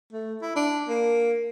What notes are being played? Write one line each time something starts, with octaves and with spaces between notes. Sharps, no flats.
A3
E4
D4
A#3